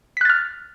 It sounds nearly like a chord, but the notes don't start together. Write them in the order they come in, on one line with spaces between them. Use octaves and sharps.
B6 F#6 A6 F6